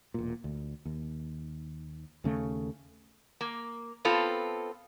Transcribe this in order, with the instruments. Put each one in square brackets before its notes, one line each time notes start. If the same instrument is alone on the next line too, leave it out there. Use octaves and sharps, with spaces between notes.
[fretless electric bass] E1 A#2
D2
D#2
D#2 C#3 A3
[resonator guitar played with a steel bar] A#3
B3 C4 F4 A4